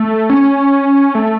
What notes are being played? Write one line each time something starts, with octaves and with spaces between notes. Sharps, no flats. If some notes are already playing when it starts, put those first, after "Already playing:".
Already playing: A3
C#4
A3